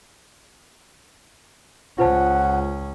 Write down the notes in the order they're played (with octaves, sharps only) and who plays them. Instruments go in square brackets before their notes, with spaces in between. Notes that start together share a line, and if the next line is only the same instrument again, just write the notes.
[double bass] C#2 C#4 [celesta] F4 C5 A5 [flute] F#5